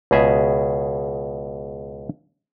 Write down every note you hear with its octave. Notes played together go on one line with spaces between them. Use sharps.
C#2 B2 G#4 E5